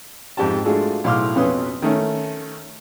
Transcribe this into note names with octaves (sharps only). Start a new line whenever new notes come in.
F2 G#2 G4 G5 A5
G#3 A3 D4 F4 F#4 G#4
B1 A2 F5 C6 D6 F6
F2 B2 C#4 B4 C6 D#6
D#3 A3 C#4